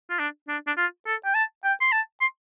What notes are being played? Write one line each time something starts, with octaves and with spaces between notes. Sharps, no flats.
F4
D4
D4
D4
F4
A4
G5
A5
G5
C6
A5
C6